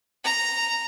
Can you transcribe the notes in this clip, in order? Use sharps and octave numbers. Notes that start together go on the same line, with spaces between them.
A#5